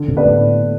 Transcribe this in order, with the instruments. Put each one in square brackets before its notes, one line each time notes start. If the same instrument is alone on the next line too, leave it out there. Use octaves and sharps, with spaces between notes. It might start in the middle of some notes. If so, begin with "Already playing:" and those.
Already playing: [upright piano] D3
[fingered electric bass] B2
[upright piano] B3 D4 B4 D5
[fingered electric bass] A2